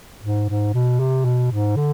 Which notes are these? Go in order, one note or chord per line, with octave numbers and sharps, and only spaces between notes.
G#2
G#2
B2
C3
B2
G#2
D3